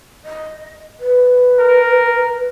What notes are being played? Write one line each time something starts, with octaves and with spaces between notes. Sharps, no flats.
D#5
B4
A#4